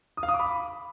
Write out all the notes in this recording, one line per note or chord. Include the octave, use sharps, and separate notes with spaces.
D#6
F5
D#6
D6
B5